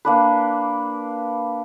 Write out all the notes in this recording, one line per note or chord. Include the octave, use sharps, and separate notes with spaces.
A#3 D4 B4